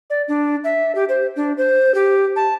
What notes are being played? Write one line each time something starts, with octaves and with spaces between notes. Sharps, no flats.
D5
D4
E5
G4
C5
D4
C5
G4
A5